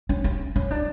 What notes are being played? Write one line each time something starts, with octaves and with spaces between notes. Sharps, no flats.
C#4
C#4
C#4
D4